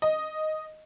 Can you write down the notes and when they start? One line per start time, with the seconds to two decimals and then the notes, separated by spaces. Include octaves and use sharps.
0.02 D#5